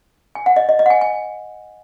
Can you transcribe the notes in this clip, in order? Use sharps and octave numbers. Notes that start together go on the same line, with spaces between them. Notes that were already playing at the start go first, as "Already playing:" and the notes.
G#5
F#5
D#5
D#5
D#5
F#5
G#5
G#5